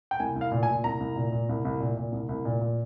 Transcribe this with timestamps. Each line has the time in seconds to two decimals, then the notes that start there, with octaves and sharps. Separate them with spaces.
0.11 G5
0.20 C2 G#5
0.36 C2
0.41 F5
0.51 A#2
0.63 G#5
0.68 A#2
0.84 C2 A#5
1.00 C2
1.16 A#2
1.32 A#2
1.49 C2
1.65 C2
1.80 A#2
1.97 A#2
2.12 C2
2.29 C2
2.45 A#2
2.61 A#2